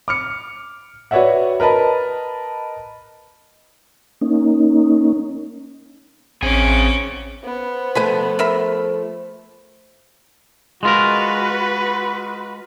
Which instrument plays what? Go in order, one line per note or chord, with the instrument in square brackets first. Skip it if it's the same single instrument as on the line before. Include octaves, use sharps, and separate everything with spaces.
[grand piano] D6 F6 C#7
F#4 B4 C#5 D5 E5 F#5
A#4 B4 D#5 A5 B5
[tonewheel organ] A#3 C#4 D#4
[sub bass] A1 [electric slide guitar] C4 G#4 G#5 [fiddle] C#4 D6
[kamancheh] B3 [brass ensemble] C5
[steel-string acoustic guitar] F3 A3 [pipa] B4 G#5 B5
[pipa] A#4 E5 B5
[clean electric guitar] G#3 F4 A#4 [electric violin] F#4 B4